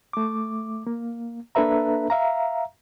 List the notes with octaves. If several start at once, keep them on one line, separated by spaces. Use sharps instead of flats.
A3 D6
A#3
A#3 D4 A4 B4 E5 A#5
E5 F5 A#5